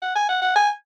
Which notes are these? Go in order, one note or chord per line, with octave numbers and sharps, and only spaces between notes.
F#5
G#5
F#5
F#5
G#5